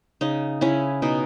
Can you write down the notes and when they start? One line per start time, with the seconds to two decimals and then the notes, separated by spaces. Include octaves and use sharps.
0.21 C#3 D#4
0.61 C#3 C#4 E4
1.02 B2 D#4